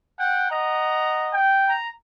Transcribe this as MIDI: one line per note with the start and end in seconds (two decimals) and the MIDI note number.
0.19 0.50 78
0.19 0.50 79
0.51 1.36 75
0.51 1.36 78
0.51 1.36 82
1.34 1.75 79
1.68 1.88 82